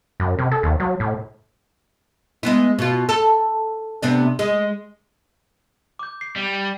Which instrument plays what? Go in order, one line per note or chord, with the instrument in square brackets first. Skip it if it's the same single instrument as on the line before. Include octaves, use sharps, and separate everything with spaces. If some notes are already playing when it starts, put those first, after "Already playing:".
[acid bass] F#2
C3
A4
D#2
F#3
A2
[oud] G#3 B3 E4
B2 F4
A4
C3 B3 D4
G#3
[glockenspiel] D6 G6
C7
[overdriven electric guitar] G3